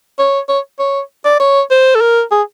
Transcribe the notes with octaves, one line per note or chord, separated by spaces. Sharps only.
C#5
C#5
C#5
D5
C#5
C5
A4
A#4
G#4